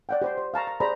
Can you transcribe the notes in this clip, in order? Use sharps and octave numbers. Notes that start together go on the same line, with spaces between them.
D5 F#5 G5
G4 C5 C6
C5
F5 A5 A#5 C#6
A#5
G4 G#4 C5 D5 A#5 B5